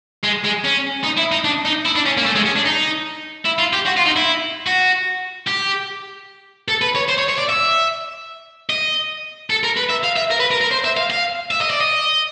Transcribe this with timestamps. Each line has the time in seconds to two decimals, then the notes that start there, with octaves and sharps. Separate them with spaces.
0.24 G#3
0.44 G#3
0.64 C#4
1.04 D#4
1.18 E4
1.32 D#4
1.44 D4
1.65 D#4
1.85 E4
1.96 D4
2.06 C#4
2.17 A#3
2.26 A3
2.35 G#3
2.46 C#4
2.56 D4
2.65 D#4
3.45 E4
3.59 F4
3.73 G4
3.86 F#4
3.97 F4
4.06 D#4
4.16 E4
4.67 F#4
5.47 G4
6.68 A4
6.82 B4
6.95 C#5
7.08 C5
7.18 C#5
7.28 C#5
7.38 D5
7.49 E5
8.70 D#5
9.50 A4
9.64 A#4
9.77 B4
9.90 E5
10.04 F5
10.16 E5
10.31 A#4
10.40 B4
10.51 A#4
10.61 A#4
10.71 C5
10.84 E5
10.97 F5
11.10 F5
11.51 E5
11.61 D#5
11.70 D5
11.81 D#5